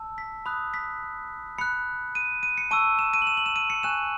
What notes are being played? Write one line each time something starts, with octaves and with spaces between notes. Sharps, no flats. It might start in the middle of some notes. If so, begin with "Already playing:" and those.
Already playing: A5 E6
B6
B5 D#6 F#6
B6
B5 F#6 C#7
D#7
D#7
C#7
A5 C#6 E6 D#7
E7
D#7
F#7
E7
F#7
E7
D#7
C#7
G#5 C#6 F#6 E7